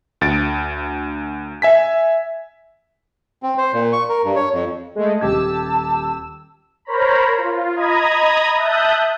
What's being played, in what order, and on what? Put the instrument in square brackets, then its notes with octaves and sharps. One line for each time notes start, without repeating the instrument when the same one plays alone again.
[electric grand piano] D2 A6 D7
E5 G#5 B6
[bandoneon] C4
C5
A#2
C#6
A#4
G2
C#5
F2
[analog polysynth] G#3 A3
[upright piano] D#1 G4 G#6 [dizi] A5 [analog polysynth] E6
[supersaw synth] A#4 C5 C#5 A#5 B5
F4
D#5 A#5 B5 D#6 G#6
E5 A5 D#6 F#6 G6